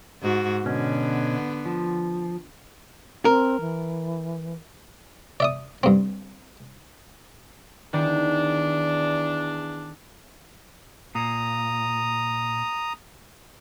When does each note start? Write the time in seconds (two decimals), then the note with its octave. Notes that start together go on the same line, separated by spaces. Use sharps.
0.22 G#2 F#4
0.65 B2 D3 B3 C#4
1.66 F3
3.25 C4 A#4
3.60 E3
5.40 D5 E5 D#6
5.83 G2 C4
7.93 E2 D#3 D4
11.15 A#2 A#5 D#6